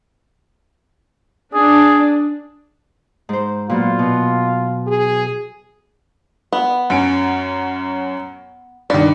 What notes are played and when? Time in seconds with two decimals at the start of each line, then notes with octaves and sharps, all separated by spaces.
1.54 D4 G#4
3.29 G#2 C5
3.70 A#2 F#3 B3 F4
3.99 B2
4.87 G#4
6.52 B3
6.90 F#2 C#4 D7
8.90 G2 D#3 D5